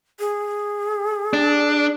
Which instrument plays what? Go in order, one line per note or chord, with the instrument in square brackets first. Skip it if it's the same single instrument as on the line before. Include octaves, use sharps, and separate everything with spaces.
[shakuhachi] G#4
[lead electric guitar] D4